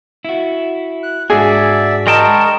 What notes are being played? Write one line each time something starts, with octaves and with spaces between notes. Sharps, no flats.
E4 F#4
F#6
G#2 D4 F#4 G#4 D5 E5
G#3 A#4 D#5 G5 A5 C#6